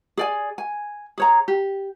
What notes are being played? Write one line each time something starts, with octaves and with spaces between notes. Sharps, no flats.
G#4 D5 G#5
G#5
G#4 C#5 A#5
G4